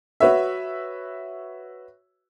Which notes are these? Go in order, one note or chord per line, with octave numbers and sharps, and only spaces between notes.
F#4 B4 C#5 E5